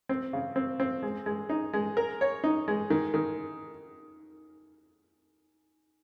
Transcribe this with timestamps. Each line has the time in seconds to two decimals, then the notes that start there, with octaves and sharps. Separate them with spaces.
0.09 C4
0.33 C#3
0.56 C4
0.80 C4
1.03 G#3
1.26 G#3
1.49 D#4
1.74 G#3
1.97 A#4
2.21 C#5
2.44 D#4
2.68 G#3
2.90 D#3
3.14 D#3